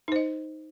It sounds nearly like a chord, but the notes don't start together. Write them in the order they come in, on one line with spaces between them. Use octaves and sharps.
D#4 C5 D#5